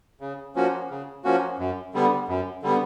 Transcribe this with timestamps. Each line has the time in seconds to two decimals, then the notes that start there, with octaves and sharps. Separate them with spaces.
0.21 C#3
0.55 F3 A#3 C#4 F#4
0.90 C#3
1.24 F3 A#3 C#4 F#4
1.58 F#2
1.94 D3 G3 B3
2.28 F#2
2.63 D3 G3 B3